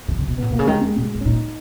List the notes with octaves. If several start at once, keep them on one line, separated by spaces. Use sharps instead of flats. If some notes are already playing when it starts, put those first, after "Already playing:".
D#3
C#3
B2
A#2 B3
B2 A#3
C#3
D#3 G#3
G#3
B2 G#3
G#2
C#4
A#2 D#4